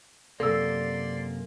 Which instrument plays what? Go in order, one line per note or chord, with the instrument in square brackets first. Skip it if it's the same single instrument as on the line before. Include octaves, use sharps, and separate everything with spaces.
[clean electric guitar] F#2 C3 A#3 [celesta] A4 E6 [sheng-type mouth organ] D5 C6